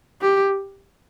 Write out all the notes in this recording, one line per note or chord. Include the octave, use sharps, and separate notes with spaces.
G4